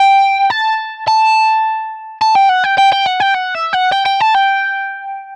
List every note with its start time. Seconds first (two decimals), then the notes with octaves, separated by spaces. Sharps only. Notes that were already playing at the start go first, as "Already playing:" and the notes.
Already playing: G5
0.50 A5
1.08 A5
2.22 A5
2.35 G5
2.49 F#5
2.64 G5
2.78 G5
2.93 G5
3.07 F#5
3.20 G5
3.34 F#5
3.55 E5
3.73 F#5
3.92 G5
4.06 G5
4.20 A5
4.34 G5